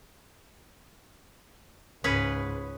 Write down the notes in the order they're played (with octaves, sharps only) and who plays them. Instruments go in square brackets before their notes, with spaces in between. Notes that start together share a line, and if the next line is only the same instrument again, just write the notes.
[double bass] C#2 G#2 [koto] C#4 G#4 B4